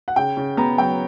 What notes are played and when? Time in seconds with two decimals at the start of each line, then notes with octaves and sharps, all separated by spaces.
0.08 F#5
0.16 C#3 G5
0.37 C#3
0.57 B3 A#5
0.78 F#3 G5